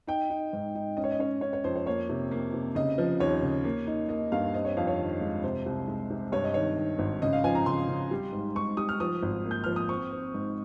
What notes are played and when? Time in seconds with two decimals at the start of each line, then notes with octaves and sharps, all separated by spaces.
0.07 D#4 G5
0.30 D#4
0.53 G#2
0.75 D#4
0.97 C#4 D#5
1.04 C#5
1.12 D#5
1.19 C#4 C#5
1.41 C#4 C#5
1.53 C#5
1.64 F2 C5
1.76 C#5
1.86 A#3 C#5
2.09 C3
2.31 A#3
2.54 C3
2.75 C#3 D#5
2.98 F3
3.20 D#2 C#5
3.43 C#3
3.64 A#3
3.87 D#4
4.09 A#3 D#5
4.32 G2 F5
4.54 C4 D#5
4.65 C#5
4.77 F2 F5
4.88 C#5
4.99 D#3
5.20 G#3
5.44 C3 C5
5.66 C2
5.88 G#3
6.10 C3
6.32 G2 C#5
6.44 D#5
6.54 D#3 C#5
6.77 D#3
6.99 G#1
7.22 C#3 D#5
7.33 F5
7.44 F3 G#5
7.55 A#5
7.66 C#3 C6
7.88 C#3
8.11 G3
8.33 G#2
8.55 G#2 C#6
8.77 G3 D#6
8.89 F6
9.00 F3 D#6
9.22 G#1
9.45 A#3
9.51 G6
9.64 F3 F6
9.76 D#6
9.89 C4 C#6
10.12 C4
10.34 G#2